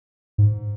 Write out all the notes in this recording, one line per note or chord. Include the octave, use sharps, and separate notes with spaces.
G#2